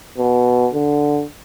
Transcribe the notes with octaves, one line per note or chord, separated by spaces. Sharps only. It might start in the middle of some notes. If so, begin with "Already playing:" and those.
B2
D3